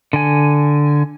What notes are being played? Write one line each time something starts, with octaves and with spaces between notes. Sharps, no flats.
D3 G#5